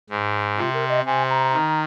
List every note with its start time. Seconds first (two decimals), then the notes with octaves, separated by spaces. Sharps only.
0.10 G#2
0.57 C3 F4
0.74 A#4
0.89 D#5
1.05 C3 G#5
1.29 A#5
1.53 D#3